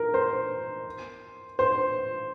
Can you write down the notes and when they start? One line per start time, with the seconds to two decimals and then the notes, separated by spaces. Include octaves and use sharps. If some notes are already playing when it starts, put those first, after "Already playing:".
Already playing: A#4
0.14 C5
1.59 C5